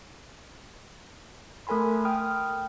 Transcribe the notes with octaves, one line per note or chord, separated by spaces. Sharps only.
A3 A4 A#4 G#5 B5 C6
G5 D#6 F6